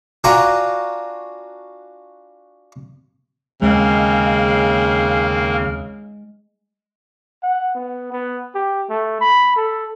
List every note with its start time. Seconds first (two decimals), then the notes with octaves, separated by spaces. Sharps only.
0.24 D4 F4 F#4 F#5 G#5 A#5
3.62 D#2 C#3 G#3 A#3 C4 A#4 F5
7.43 F#5
7.75 B3
8.12 B3
8.55 G4
8.90 A3
9.21 B5
9.56 A4